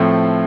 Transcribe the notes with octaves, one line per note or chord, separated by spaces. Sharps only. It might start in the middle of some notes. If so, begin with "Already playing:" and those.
Already playing: A2 F3 A3 C4